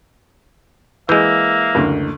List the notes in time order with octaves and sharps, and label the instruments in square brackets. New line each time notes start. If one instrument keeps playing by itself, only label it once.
[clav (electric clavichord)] E3 G#3 [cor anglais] A#3 [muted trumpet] E5 [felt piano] G6
[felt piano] F#1 D2